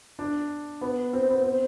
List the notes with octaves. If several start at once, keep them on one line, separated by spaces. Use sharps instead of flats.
D4
B3
C4
B3
C4